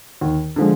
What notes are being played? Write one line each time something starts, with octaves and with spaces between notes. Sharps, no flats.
D#2
D3 F3 G#3